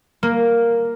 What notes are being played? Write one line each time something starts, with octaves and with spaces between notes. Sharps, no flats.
A#3